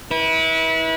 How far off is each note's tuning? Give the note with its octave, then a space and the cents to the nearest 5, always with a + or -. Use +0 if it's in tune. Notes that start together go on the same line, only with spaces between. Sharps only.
E4 -30 B4 -25